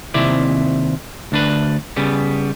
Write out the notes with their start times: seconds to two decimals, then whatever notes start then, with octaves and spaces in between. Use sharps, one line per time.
0.14 D#2 C3 C4 E4 D5
1.32 D2 D4 B4
1.97 C#3 G3 B3